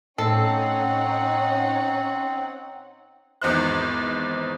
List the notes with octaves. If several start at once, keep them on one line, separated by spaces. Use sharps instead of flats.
A2 C4 C#4 D#4 A4 F#5 C7
G#1 E2 D#4 C5 F#6